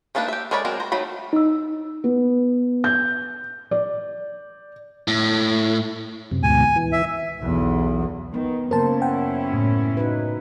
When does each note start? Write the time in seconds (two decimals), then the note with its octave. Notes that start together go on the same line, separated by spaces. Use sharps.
0.15 A3 A#3 D4 D#4 B4
0.28 G4 E5
0.51 G#3 A#4 C#5 D5 B5
0.65 F#3 G#3 C4 A#4
0.80 C5 A#5
0.92 D#3 F#3 A3 B5
1.33 D#4 E6
2.04 B3
2.84 G6
3.71 D5
5.08 A2
6.31 F#2 C3
6.43 D2 G#2 B2 G#5
6.76 E3
6.92 E5
7.41 B1 E2
8.34 D#3 B3
8.71 F#2 C#3 A#3 C#4 E4 A#4 C5 A5
9.02 F#5 G5
9.53 A2
9.97 D#4 F#4 B4